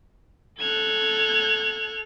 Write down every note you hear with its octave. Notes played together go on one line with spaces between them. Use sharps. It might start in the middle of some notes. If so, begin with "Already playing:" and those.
A4 F#6 G#6 F7